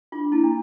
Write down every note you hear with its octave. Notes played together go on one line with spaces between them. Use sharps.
D4 F4
A#3 E4
D4